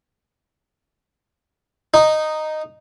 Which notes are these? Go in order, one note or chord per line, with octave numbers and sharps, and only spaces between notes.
D#4